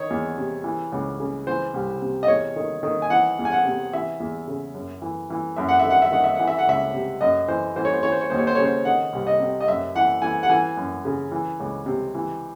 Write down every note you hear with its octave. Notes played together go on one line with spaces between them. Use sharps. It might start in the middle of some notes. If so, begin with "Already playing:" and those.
Already playing: D#3 C#5
E2
C3
E3
C#2
C#3
E3 C5
C2
C3
D#5
E2 C#5
D#3
D#3
G#5
E3 F#5
E2
G#5
F#5
C3
E3 E5
E2
C#3
F#2
E3
E3
F#2 E5
F#5
D#3 E5
F#5
E5
D#3 F#5
E5
E3 F#5
E5
F#5
C#2 E5
C3
F#2 D#5
E3 C5
E3 C5
C#5
C5
E3 C#5
C5
C#5
D#2 C5
C#5
C5
C#3 C#5
C5
D#3 F#5
C2
D#5
C3
D#5
F#2 E5
E3 F#5
E3 G#5
F#5
E3 G#5
F#2
C#3
E3
C#2
C3
E3